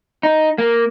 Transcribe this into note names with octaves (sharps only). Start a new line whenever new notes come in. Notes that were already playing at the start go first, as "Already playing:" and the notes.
D#4
A#3